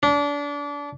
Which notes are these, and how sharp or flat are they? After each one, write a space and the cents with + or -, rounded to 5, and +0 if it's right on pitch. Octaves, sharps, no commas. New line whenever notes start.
D4 -30